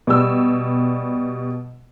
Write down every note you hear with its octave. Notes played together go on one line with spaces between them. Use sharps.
B2 G3 E6